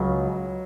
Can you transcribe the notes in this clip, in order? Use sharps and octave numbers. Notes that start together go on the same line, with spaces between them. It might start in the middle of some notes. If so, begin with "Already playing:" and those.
Already playing: C#2 C#3 F#3